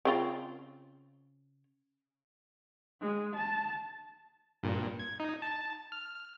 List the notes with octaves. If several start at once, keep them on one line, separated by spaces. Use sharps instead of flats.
C#3 C4 F4
G#3
A5
G2 A#2
G#6
D#4
A5
F6